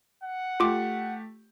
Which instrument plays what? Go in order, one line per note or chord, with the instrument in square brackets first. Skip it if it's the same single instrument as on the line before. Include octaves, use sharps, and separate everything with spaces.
[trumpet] F#5
[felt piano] A3 G4 [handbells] F4 D6